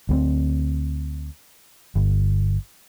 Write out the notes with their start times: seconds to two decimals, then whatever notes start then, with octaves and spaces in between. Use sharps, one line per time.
0.09 D2 A#3 C4
1.95 G1